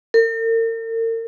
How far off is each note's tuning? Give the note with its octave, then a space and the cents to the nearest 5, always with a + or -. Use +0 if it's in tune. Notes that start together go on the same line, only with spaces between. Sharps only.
A#4 -45